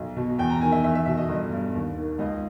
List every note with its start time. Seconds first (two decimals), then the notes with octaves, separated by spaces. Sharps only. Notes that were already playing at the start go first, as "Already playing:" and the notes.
Already playing: B1
0.16 B2
0.38 E2 G5
0.50 A#5
0.61 D#3 G#5
0.72 E5
0.84 E2 E5
0.95 E5
1.06 B2 E5
1.17 D#5
1.29 G1
1.52 G2
1.74 D#2
1.97 D#3
2.19 C#2 D#5